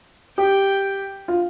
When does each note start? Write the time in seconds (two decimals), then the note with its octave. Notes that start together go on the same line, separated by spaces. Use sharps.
0.38 G4 G5
1.28 F4